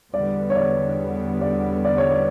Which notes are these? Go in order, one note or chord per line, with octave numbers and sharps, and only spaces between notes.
E2 D3 G3 B3 D5
C#5
D5
D5
D5
C#5
D5